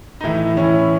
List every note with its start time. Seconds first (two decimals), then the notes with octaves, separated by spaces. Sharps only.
0.21 D#4
0.23 A2 E3 E4
0.57 A2 E3 C#4